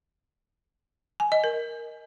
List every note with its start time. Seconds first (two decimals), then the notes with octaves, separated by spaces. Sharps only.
1.20 G#5
1.32 D#5
1.44 A#4